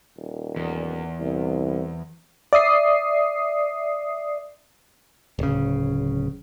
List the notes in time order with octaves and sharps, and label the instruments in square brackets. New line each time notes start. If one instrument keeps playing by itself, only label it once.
[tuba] D#1
[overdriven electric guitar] E2
[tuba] C2
[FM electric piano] D5 E5 D#6 C7
[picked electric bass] D1 C#3